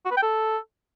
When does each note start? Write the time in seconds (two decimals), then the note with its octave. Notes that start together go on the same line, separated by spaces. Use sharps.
0.05 F#4
0.11 B4
0.17 G5
0.22 A4